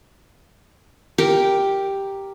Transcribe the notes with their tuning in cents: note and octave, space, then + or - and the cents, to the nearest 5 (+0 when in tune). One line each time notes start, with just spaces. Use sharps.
G4 +0 A#4 +0